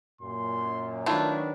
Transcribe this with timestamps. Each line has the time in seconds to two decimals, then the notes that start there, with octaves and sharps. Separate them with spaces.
0.21 F#2 A#2 C6
1.06 D#3 F#3 A3 D4 E4 F4 B4